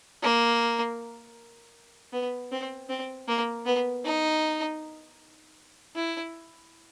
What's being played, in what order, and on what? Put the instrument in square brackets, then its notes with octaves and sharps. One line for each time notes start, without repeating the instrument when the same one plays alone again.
[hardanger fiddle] A#3
B3
C4
C4
A#3
B3
D#4
E4